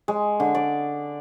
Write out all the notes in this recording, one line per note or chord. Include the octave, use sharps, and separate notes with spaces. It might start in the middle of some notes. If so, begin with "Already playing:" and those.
G#3
D3
D5